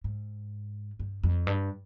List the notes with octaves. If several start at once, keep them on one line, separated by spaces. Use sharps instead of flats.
G#2
G2
F2
G2